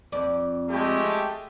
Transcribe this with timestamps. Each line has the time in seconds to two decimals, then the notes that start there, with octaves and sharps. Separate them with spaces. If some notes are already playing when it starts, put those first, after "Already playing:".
0.12 F2 D5
0.69 G#3 A3 G4